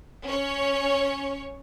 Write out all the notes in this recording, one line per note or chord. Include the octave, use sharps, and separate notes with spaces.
C#4 C#5